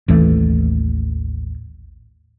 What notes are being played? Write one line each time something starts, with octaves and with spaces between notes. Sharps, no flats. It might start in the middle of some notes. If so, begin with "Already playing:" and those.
A1 D#2 E3 A3